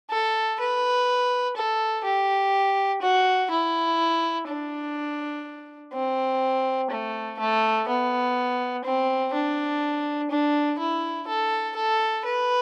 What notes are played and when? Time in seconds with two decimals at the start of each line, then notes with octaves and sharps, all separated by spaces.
0.11 A4
0.60 B4
1.57 A4
2.04 G4
3.02 F#4
3.50 E4
4.48 D4
5.93 C4
6.90 A3
7.39 A3
7.88 B3
8.85 C4
9.34 D4
10.30 D4
10.79 E4
11.28 A4
11.76 A4
12.25 B4